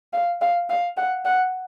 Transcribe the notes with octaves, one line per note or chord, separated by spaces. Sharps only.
F5
F5
F5
F#5
F#5